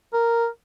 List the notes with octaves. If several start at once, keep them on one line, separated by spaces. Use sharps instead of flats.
A#4